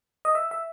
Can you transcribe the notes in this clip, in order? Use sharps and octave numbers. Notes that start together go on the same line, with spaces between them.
D#5
E5
E5